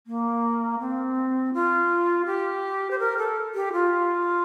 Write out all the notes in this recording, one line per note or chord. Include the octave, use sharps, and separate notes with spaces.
A#3
C4
F4
G4
C5
A#4
A4
G4
F4